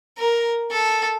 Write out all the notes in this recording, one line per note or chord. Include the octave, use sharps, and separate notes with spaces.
A#4
A4